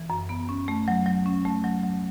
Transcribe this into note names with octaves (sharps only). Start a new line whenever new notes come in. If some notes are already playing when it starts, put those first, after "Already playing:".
Already playing: E3
F#2
B3
C#4
A3
F#3
F#3
C#4
A3
F#3
F#3